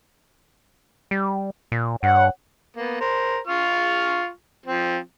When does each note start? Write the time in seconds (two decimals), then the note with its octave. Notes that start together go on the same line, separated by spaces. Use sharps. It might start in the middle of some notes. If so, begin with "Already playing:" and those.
1.11 G3
1.72 A#2
2.03 G2 C#5 F#5
2.76 A#3 B3
3.01 A#4 C5
3.47 F4 C#6 F6
4.66 F3 C4